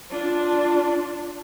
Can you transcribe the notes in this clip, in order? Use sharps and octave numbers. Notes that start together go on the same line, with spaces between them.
D4 F4